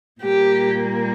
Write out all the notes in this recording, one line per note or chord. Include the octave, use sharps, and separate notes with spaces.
A#2 G3 A#3 G4